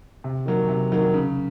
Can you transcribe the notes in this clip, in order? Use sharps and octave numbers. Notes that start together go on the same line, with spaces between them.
C3
D#3 F#3 A#3
C3
D#3 F#3 A#3
C#3